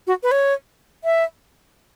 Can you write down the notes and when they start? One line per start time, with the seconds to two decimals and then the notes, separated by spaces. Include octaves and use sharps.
0.07 F#4
0.23 B4
0.31 C#5
1.04 E5